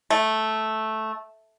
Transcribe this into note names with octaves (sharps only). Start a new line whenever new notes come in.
A3